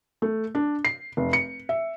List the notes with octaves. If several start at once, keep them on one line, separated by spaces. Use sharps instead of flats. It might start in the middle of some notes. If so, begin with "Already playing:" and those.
A3
D4
C7
F1
C#7
E5